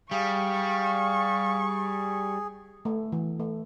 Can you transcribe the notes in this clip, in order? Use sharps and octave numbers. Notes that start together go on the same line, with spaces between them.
G3 G#4 F5 C#6
A3
E3
A3